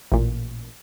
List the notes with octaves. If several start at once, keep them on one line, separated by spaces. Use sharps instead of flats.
A1 A#2